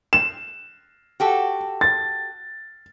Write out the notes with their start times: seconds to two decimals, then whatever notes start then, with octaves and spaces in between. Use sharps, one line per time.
0.13 E7
1.20 F#4 G4 A4
1.81 A6